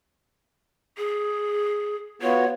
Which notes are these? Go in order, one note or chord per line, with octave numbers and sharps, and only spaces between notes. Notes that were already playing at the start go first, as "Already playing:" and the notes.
G#4
B3 F4 F#4 C#5